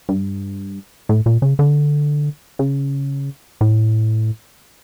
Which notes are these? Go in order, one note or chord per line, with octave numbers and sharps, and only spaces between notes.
G2
A2
A#2
C#3
D3
C#3
A2